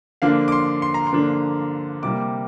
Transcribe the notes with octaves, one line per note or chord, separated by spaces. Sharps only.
D3 F3 A#3 D4 F5
D6
C6
C6
A#5
C6
D3 F3 A#3 D4
C3 G3 A#3 D6